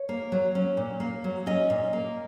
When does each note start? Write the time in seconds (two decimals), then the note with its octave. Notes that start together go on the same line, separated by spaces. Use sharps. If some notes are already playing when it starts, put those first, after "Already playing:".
Already playing: C#5
0.09 A#3
0.32 F#3
0.55 C#4
0.77 A#2
1.00 A#3
1.24 F#3
1.46 C#4 D#5
1.70 A#2
1.93 A#3